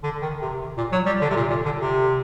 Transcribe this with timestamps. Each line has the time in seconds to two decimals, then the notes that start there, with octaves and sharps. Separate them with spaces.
0.04 D3
0.22 D#3
0.42 C3
0.77 A#2
0.92 F#3
1.06 G3
1.22 D3
1.30 C3
1.36 A#2
1.50 A#2
1.65 D3
1.80 C3